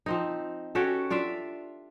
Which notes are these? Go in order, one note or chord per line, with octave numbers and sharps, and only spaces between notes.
F3 C4 D#4
C#4 F#4 G4 A4
D4 F4 D5 E5